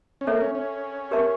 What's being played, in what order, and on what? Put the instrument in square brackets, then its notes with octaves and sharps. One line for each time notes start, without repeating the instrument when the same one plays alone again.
[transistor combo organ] C#4
[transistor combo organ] A#3 [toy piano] A4 C#5 E5
[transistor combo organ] C#4
C#4
[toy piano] G4 A#4 E5 A5 C#6